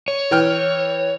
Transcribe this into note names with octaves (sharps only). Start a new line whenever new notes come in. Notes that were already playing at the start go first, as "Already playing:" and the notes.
C#5
E3 G5 F6